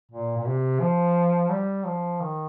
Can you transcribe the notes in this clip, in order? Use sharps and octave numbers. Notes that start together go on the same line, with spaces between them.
A#2
A#2
C3
F3
G3
F3
D#3